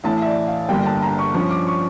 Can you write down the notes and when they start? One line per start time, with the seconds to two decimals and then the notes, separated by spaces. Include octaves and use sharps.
0.04 A1 A2 E3 A5
0.22 E5
0.26 D5
0.48 F5
0.69 G1 G2 D3 G3 A#3 G5
0.86 A5
1.02 A#5
1.19 C#6
1.34 G2 F3 C#4 C#6
1.51 D6
1.67 C#6